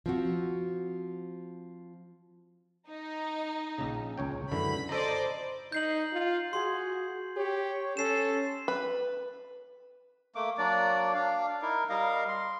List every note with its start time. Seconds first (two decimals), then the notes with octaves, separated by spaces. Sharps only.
0.06 F3 C4 F#4
2.88 D#4
3.78 A#1 C#3
4.18 C#2 C#5 G5
4.52 F#2 D3 E3 B5
4.89 A4 C5 D5 D#5 A#5
5.72 D#4 G6 C7 F#7
6.13 F4
6.53 F#4 G#4 C6
7.36 G4 C#5
7.97 C#4 A4 C7 E7
8.68 B4
10.35 A3 A#3 D6
10.58 F#3 A#3 D4 D5
11.14 D4 F5
11.62 D#4 E4 A#4
11.89 G3 A#4 D#5 F5
12.28 C6